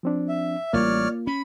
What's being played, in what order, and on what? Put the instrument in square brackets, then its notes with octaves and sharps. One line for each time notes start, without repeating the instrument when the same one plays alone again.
[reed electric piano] F3 C4 D4
[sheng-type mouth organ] E5
[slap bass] A1 G3 [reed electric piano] A#3 F4 [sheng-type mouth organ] C#5 D5 F6
[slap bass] C#4 [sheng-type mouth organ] B5